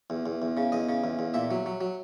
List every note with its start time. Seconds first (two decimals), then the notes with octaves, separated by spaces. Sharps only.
0.10 E2
0.26 E2
0.42 E2
0.57 C#3
0.72 E2 D#5
0.89 C#3
1.04 E2
1.19 E2
1.34 A#2 E5
1.51 F#3
1.66 F#3
1.81 F#3